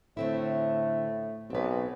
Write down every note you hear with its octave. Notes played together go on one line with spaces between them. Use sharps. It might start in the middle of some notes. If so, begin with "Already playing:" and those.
A2 D3 A3 C4 E4
B1 C4 B4